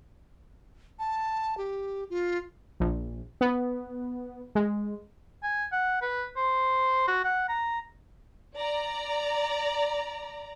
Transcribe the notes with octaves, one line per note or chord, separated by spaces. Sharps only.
A5
G4
F4
A#1
B3
G#3
G#5
F#5
B4
C5
F#4
F#5
A#5
D5 A#5